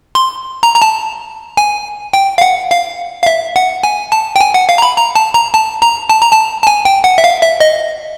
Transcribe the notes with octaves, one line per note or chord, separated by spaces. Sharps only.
C6
A#5
A#5
A5
G#5
G5
F5
F#5
F5
F5
E5
F#5
G#5
A5
G5
G#5
F#5
F5
A#5
B5
A#5
A5
A#5
A5
A#5
A5
A#5
A5
A5
G#5
G5
F#5
E5
F5
E5
D#5